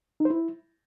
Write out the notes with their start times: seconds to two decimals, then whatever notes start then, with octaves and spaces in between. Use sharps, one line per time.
0.20 D#4
0.25 C5
0.30 E4